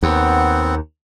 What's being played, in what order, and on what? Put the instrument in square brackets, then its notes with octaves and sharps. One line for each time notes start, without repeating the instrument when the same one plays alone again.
[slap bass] D#2 [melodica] B3 C4 F#5